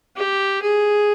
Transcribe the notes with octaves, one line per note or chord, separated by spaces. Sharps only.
G4
G#4